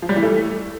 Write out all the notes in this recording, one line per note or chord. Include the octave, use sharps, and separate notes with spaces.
F3
G3
E3
A3